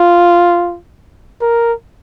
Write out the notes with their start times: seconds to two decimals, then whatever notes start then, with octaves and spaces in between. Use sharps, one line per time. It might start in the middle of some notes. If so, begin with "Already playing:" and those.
Already playing: F4
1.41 A#4